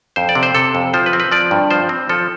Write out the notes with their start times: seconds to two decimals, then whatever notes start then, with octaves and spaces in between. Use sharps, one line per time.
0.16 F2 C5
0.29 D5
0.35 C3
0.43 C5
0.54 C3 A4
0.75 F2
0.94 F3 C5
1.06 B4
1.13 C4
1.20 B4
1.32 F3 D5
1.51 G2
1.71 F3 C5
1.89 C4
2.09 F3 A4